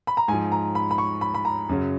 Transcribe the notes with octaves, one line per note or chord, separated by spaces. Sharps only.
B5
A#5
G#2 G#5
F3
A#5
B5
B5
C#6
B5
B5
A#5
F#2 C#3 F#3